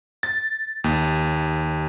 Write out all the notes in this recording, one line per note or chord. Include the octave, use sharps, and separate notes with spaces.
A6
D#2